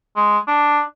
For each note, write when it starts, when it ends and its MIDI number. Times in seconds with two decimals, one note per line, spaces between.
0.16 0.38 56
0.48 0.81 62